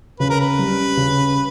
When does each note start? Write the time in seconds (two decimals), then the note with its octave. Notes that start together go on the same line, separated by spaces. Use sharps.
0.20 C#3 B4
0.30 A#4
0.40 B4
0.59 G3 C#4
0.97 C#3